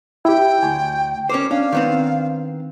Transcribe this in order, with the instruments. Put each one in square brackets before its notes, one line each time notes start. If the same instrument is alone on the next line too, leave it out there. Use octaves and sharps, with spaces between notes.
[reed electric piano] E4 G4 [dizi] G5
[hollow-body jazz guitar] D2 [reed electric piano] G#5
[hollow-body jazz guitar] C#4 A#4 C5 [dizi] D6
[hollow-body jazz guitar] C#4 [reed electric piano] D4 [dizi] F5
[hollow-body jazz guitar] D#3 B3 C4